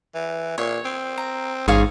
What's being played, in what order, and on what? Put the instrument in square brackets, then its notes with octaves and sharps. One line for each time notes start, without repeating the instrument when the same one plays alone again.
[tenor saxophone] E3
[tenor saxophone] A#2 [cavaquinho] C#5
[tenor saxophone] C4
[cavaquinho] A#5
[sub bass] A1 [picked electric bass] G#2 [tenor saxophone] G#4 [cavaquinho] C#5 F5 C#6